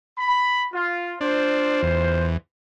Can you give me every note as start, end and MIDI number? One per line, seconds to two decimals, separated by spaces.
0.18 0.64 83
0.73 1.15 65
1.21 1.82 62
1.21 2.32 65
1.21 2.32 72
1.83 2.37 40